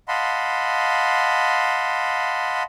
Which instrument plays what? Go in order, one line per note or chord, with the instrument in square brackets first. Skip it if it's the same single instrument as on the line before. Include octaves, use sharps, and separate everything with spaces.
[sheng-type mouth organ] D#5 F5 F#5 A5 B5 C6